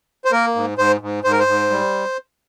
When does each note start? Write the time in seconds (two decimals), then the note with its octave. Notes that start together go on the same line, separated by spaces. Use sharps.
0.25 C5
0.32 A#3 A#4
0.55 G#2
0.78 G#2 C5
1.01 G#2
1.24 G#2 C5
1.32 A#4
1.39 C5
1.47 G#2
1.70 G3